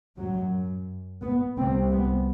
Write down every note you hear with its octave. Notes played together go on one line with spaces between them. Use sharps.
F#2 F#3
B3
C2 C3 C4
B3